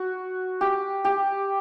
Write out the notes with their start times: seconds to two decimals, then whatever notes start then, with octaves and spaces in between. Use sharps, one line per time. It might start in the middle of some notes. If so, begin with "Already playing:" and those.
Already playing: F#4
0.61 G4
1.05 G4